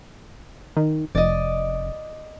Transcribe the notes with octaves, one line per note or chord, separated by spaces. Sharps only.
D#3
F1 D5 D#5